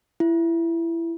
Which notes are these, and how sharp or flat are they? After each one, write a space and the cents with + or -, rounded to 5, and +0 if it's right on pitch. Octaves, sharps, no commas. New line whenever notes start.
E4 +20